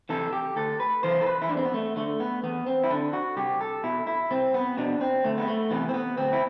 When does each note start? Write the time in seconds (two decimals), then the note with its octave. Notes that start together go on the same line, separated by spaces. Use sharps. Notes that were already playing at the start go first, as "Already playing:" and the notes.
0.09 C3 E3 A4
0.33 G4
0.56 D2 A4
0.80 B4
1.03 C3 E3 C5
1.21 A4
1.26 B4
1.42 E4
1.49 E2 D4
1.57 C4
1.65 B3
1.74 A3
1.96 D3 A3
2.20 B3
2.43 E2 B3
2.66 C4
2.84 E4
2.90 D3 D4
3.13 F#4
3.37 C2 G4
3.61 A4
3.84 B2 E4
4.07 E4
4.30 C2 C4
4.54 B3
4.78 B2 D4
5.01 C4
5.24 D2 A3
5.38 B3
5.48 A3
5.71 C3 E3 B3
5.89 C4
5.94 B3
6.17 D2 C4
6.33 E4